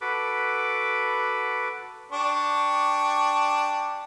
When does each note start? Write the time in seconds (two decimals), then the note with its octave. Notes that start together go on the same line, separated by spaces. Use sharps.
0.01 F#4 A4 B4 B5 D6
2.11 D4 G4 C#6